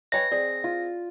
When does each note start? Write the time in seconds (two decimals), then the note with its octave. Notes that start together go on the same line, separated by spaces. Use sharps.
0.12 B4 C#5 D#5 G5 G#5 A#6
0.31 C4 G#4 D5
0.64 F4